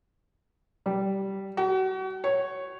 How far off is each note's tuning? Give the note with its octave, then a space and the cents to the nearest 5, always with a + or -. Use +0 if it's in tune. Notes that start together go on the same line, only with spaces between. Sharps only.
G3 -10
F#4 +35
C#5 -5